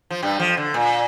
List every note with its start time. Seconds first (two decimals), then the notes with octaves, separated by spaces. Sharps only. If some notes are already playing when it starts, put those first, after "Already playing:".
0.10 F3
0.23 G2 G3
0.39 F2 F3
0.57 D3
0.74 A#2